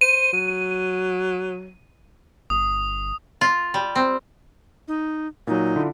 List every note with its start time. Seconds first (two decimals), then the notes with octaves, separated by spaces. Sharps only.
0.01 C5 D#7
0.33 F#3
2.50 G1 D#6
3.41 F4
3.74 G3
3.95 C4
4.88 D#4
5.47 A#2 F#3 D#4
5.76 D3 E4 F4